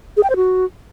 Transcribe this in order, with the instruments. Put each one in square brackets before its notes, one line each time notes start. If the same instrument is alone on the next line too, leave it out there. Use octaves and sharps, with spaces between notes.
[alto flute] G#4
G5
C5
F#4